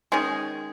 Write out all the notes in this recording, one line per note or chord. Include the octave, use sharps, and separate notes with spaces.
D#3 G#3 C#4 G#4